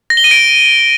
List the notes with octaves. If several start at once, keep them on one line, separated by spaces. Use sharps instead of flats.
A#6
G7
D#7
D7